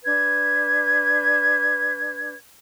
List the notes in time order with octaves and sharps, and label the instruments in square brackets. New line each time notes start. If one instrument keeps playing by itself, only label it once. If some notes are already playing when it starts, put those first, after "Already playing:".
[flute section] D4 B4 G#6